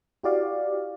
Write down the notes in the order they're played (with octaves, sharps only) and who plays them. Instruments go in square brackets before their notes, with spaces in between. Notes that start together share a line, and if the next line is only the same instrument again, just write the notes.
[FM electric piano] E4 F#4 G4 D5 F5